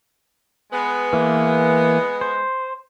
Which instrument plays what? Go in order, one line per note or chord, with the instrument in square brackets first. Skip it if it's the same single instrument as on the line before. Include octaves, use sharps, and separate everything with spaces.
[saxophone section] G#3 B3
[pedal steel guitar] E3 A#3
C5